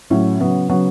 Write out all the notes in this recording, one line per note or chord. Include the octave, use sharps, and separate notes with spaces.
A2 F#3 C#4
C#3 F#3 B3
C#3 F#3 B3